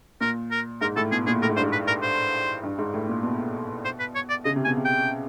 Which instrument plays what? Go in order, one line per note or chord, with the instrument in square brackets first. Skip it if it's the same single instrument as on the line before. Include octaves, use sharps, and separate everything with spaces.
[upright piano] A#2 [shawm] A#4
[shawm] A#4
[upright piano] G#2 [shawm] A#4
[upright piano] A2 [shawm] A4
[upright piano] B2 [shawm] G#4
[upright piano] A#2 [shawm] G#4
[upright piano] A2 [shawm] A#4
[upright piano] G#2
[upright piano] G2 [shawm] C5
[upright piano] G#2
[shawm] B4
A#4
C5
[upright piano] G2
G#2
A2
A#2
B2
[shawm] C5
B4
C#5
D5
[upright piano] C#3 [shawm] D#5
[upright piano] C3
[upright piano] B2 [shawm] G#5
[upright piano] C3
[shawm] G5